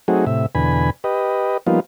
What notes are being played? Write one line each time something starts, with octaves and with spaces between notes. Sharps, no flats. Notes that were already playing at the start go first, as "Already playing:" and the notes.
F#3 A3 C4 D#4 F#4 G#4
A2 C3 E5
E2 B2 D3 G#5 B5
G4 B4 D#5
F3 G3 A#3 B3 D#4 F4